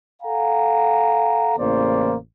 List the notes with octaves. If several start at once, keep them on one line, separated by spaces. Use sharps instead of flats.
A4 F5 F#5 G#5 A#5
A1 E2 C#3 A#3 C5 D5